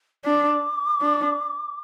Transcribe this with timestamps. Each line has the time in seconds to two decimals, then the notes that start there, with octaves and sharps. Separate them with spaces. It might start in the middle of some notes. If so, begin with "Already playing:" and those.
0.25 D4 D6
1.01 D4